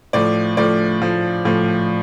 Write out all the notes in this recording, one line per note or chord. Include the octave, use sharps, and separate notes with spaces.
A2 F3 D5
A2 F3 D5
A2 F3
A2 F3